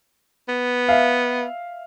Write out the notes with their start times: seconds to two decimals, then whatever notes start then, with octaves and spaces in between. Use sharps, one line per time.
0.49 B3
0.89 E5 F5